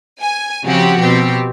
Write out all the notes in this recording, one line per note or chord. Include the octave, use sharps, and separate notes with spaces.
G#5
C#3 F3 C4 F#4 G4
B2 C4 G4